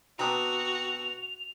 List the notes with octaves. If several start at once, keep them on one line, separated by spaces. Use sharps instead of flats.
B2 C4 D4 F#4 A#5 D#6 F7